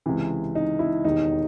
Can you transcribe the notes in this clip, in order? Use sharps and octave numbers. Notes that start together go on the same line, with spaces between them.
C#2 C3 E3
D#4
E4
E1 D#2 D#3 D#4